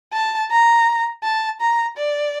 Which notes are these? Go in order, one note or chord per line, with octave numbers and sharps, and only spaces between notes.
A5
A#5
A5
A#5
D5